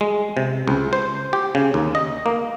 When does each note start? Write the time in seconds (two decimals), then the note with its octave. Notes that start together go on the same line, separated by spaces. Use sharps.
0.01 G#3
0.37 C3
0.68 C#2
0.93 C5
1.33 G4
1.55 C#3
1.74 D#2
1.95 D#5
2.26 A#3